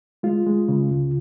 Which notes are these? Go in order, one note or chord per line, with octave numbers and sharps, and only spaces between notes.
G#3 F4
G#3
C#3
C#2